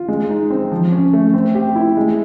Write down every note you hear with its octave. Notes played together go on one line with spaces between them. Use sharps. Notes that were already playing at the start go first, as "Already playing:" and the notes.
Already playing: F4
G#3
D#4
C4
F3
C#4
A3
C4
G4
E4
G#3